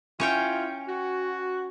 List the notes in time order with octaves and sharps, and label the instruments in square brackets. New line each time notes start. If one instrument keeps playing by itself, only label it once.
[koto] C#4 C#5 G5 [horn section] E4 F4
[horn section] F#4